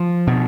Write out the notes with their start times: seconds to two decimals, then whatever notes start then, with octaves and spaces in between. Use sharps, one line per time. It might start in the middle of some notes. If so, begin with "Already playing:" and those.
Already playing: F3
0.28 B2